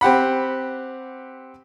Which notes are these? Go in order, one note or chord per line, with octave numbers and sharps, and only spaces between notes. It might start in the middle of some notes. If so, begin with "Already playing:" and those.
C4 G4 F#5 B5